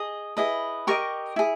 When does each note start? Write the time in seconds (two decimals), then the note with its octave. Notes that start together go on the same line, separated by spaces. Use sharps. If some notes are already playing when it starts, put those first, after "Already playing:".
Already playing: G#4 D#5 D#6
0.37 E4 G#4 B4 D#5
0.87 G4 A#4 D#5 C#6
1.36 E4 G#4